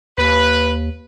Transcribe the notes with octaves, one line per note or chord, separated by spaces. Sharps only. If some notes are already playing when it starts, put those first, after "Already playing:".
D#2 B4